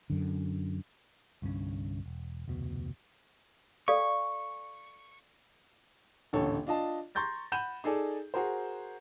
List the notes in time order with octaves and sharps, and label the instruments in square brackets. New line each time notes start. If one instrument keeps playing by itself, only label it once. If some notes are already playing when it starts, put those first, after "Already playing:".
[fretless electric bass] F#2 D3
[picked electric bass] C2 G2 D3 C#4
E1
F1 D2 B2
[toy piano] A4 D5 F5 [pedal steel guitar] C#6
[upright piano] D#1 A1 D3 A4 C#5
D4 F4 D#5 A5
A#5 C6 C#6 G6 A6 A#6
F#5 B5 G6 D#7 E7
D#4 G#4 A4 D5
F#4 G#4 A#4 C5